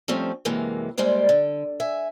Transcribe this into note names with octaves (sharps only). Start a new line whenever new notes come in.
F3 G3 A3 C4 C#4
F#2 C3 E3 G#3 A#3
G3 G#3 A#3 C5 D5
D3
E5 G#5